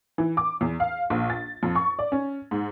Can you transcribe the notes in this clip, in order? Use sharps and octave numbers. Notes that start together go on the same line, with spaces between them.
E3
D6
E2
F5
A#1
A6
F2
C#6
D5
C#4
G#2